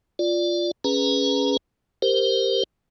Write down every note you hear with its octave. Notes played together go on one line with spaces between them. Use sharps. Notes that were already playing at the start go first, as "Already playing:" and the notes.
F4 D5
C#4 G#4 B4 A#5
G4 A#4 C5